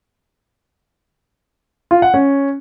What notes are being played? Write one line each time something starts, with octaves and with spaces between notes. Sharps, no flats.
F4
F#5
C#4